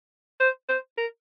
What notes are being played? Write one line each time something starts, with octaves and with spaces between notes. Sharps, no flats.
C5
C5
A#4